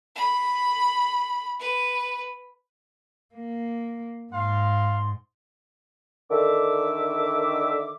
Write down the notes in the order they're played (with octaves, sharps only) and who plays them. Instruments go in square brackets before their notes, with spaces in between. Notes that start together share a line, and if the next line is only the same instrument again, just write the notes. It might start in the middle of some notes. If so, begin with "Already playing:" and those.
[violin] B5
B4
[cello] A#3
[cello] G#2 [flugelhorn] F5 [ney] C6
[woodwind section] D3 D#3 E5 D6